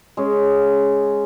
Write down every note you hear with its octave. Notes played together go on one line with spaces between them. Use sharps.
G#3 C#4